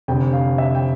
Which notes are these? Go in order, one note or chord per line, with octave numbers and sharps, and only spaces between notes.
F1 F2 D3 G5
F5
E5
G5